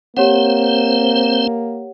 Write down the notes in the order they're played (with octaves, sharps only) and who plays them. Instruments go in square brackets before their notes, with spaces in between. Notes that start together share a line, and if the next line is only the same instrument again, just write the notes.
[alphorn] A#3 [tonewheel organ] C4 C5 [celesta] G4 C#5 F#5